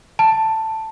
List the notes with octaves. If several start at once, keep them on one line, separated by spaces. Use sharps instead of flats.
A5